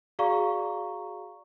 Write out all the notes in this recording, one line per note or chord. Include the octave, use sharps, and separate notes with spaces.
F#4 G#4 D5 F5 A#5 C#6